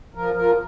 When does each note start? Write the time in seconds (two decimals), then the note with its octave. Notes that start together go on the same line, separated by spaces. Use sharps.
0.15 F3 A#4
0.36 F3 A#4